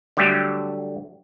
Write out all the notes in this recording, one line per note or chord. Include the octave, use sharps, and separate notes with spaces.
D3 F#3 G3 A3 G4